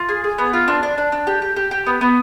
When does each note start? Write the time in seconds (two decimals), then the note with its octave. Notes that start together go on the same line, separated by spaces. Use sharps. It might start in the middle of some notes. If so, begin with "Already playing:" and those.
Already playing: F4
0.09 G#4
0.24 G#4
0.38 B3
0.53 F4
0.68 D4 C6
0.83 D4
0.98 D4
1.12 D4
1.27 G4
1.42 G4
1.56 G4
1.71 G4
1.86 B3
2.01 B3